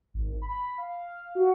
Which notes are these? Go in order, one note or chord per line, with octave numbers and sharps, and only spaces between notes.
G#1
B5
F5
F#4